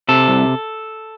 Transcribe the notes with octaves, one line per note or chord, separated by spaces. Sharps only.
C3 A4
C2